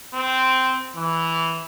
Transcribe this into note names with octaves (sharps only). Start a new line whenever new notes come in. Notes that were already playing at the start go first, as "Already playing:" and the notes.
C4
E3